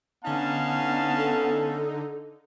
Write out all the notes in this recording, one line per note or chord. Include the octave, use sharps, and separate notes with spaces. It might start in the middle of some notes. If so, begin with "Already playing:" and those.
D3 B3 C#4 D#4 F5 A5
A4